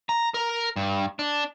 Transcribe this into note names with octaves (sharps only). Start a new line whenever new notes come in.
A#5
A#4
G2
D4